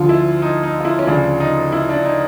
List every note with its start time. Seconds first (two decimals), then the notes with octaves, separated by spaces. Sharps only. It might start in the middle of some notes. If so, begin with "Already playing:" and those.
Already playing: D2 D3 F3 F4
0.09 E4
0.42 D#4
0.63 D#4
0.80 F4
0.85 E4
0.99 C#4
1.07 D2 C#3 F3 D4
1.40 D#4
1.72 E4
1.89 D4
2.05 D#4